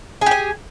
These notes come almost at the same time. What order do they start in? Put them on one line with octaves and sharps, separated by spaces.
G#4 G4 G#5